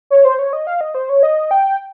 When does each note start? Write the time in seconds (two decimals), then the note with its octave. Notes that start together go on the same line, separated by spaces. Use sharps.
0.10 C#5
0.25 C5
0.39 C#5
0.53 D#5
0.67 F5
0.81 D#5
0.95 C5
1.09 C#5
1.23 D#5
1.51 G5